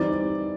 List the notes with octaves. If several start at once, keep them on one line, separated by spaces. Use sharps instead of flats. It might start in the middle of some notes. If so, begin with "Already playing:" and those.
Already playing: E3 G3 C4 D#4 D5